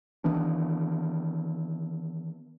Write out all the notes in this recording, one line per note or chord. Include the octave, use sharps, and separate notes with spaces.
D#3 E3 B3 D4